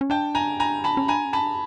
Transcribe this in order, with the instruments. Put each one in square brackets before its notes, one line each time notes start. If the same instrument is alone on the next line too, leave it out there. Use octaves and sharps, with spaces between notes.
[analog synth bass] C#4
[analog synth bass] D4 [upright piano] G5 A5
[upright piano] G#5 A#5
G#5 A#5
A5 B5
[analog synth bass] C#4
[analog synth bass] D4 [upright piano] G#5 A#5
[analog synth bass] C#4
[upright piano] A5 B5
[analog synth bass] D4